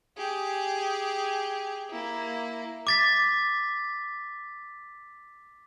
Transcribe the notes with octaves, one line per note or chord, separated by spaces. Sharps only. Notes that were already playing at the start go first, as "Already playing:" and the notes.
G4 G#4
A#3 E4
D6 A6 B6